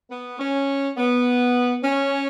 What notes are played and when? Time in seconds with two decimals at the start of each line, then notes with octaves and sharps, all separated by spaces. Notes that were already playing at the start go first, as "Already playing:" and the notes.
0.10 B3
0.39 C#4
0.97 B3
1.83 C#4